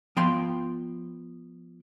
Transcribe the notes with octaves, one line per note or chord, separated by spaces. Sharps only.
F3 B3 G5 C6